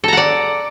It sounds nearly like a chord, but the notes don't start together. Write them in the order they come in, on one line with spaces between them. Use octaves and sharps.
A4 A#5 F#5 D5